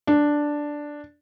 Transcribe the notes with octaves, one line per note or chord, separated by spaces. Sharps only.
D4